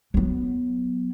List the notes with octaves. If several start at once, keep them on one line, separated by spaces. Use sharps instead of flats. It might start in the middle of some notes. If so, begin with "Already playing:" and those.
F#3 B3